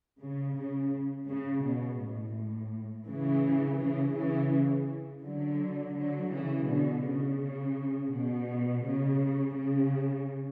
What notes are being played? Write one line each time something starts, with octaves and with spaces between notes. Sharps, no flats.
C#3
C#3
C#3
B2
A2
C#3 E3
C#3 E3
C#3 E3
D3 F#3
D3 F#3
C#3 E3
B2 D3
C#3
B2
C#3
C#3